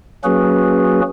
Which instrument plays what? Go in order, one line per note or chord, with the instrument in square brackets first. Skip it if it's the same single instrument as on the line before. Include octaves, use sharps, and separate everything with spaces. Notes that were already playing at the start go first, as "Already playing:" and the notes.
[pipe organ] F#3 A#3 C#4 F#4 G#4 B4